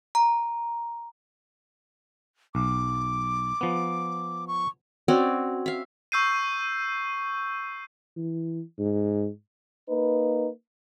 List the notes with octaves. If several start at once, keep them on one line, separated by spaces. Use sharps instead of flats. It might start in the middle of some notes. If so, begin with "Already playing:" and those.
A#5
B1 D6
F3 B3
C#6
C4 C#4 F#4 D5
E5 F5
C#6 E6 G6 C7 D#7
E3
G#2
A#3 D#4 B4